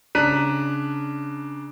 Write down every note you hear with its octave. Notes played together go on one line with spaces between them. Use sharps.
C#3 D4 A#5 F#6 B6 D#7